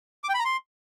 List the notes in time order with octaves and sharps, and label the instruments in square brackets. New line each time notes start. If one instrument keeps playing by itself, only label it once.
[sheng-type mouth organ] D6
G5
B5
A#5
C6